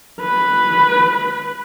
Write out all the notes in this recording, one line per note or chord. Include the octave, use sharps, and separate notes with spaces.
B4